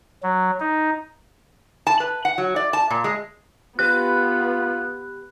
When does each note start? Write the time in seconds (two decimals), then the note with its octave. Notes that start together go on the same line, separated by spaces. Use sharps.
0.23 F#3
0.60 D#4
1.87 A5
2.00 B4
2.25 F#5
2.38 F#3
2.56 D5
2.73 A5
2.90 A#2
3.04 G#3
3.79 B3 F4 G4 B4 F#6